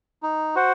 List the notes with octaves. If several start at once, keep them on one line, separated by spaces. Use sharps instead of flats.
D#4
F#4 C5 F#5